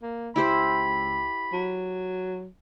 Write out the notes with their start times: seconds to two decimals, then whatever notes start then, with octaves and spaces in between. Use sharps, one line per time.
0.02 A#3
0.36 C#2 E4 G4 C5 B5
1.53 F#3